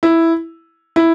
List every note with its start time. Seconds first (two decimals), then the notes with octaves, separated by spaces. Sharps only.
0.03 E4
0.96 E4